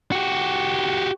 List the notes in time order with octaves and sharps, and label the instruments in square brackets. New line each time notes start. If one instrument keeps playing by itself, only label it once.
[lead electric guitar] F#4 G4